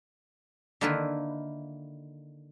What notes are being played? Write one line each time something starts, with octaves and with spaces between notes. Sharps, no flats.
D3 D#3 A#3 E4 F4 B4